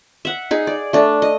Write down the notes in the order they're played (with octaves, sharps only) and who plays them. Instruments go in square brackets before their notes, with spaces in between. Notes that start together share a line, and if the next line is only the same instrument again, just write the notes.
[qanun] E5 F#5
D#4 G#4
D5
A3 D4
D#5